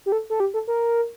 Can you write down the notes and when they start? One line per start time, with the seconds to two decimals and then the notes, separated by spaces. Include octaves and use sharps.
0.06 G4
0.12 A4
0.30 A4
0.40 G4
0.54 A4
0.68 A#4